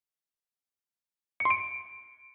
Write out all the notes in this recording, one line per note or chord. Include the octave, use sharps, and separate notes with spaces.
C#7
C6
D7